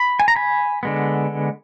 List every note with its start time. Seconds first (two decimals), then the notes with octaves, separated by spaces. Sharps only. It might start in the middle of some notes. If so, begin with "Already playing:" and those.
Already playing: B5
0.20 G#5
0.28 A#5
0.36 G#5 B5
0.83 D3 G#3 B3